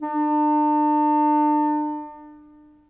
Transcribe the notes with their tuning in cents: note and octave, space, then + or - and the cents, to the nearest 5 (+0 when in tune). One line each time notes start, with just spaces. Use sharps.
D4 +35